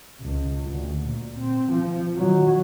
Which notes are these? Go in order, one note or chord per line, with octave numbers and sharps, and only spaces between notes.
C#2
D2
A#2
C4
F3
D#3 F#3